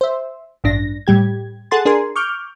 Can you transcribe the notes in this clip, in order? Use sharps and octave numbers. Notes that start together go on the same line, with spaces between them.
C5 E5
A1 G2 D4 A#6
A2 G3 G4 G#6
G#4 A4 F#5 C6 A6
D4 G#4 A#4 G#5 C6
C#6 D6 F6 G6